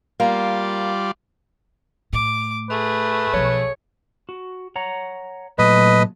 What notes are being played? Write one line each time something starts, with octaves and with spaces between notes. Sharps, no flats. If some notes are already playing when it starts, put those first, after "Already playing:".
G3 A#3 F4 D5
A2 D6
A3 G#4 B4
B1 F3 C#5
F#4
C#5 F#5 A#5
A#2 F#3 A3 B4 D#5